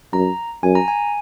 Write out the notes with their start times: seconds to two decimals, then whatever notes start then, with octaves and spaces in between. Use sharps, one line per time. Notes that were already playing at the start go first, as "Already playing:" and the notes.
0.13 F#2 A#5
0.63 F#2 G#5
0.75 A#5
0.88 G#5